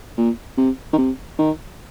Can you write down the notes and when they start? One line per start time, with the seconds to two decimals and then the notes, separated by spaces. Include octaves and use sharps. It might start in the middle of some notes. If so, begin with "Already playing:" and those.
0.18 A#2
0.58 C3
0.93 D#3
0.98 C3
1.39 D#3